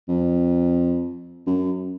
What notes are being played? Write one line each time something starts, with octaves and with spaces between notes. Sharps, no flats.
F2
F#2